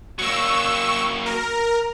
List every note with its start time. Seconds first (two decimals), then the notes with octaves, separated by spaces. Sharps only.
0.19 F#3 A#3 C#6 E6
1.26 A#4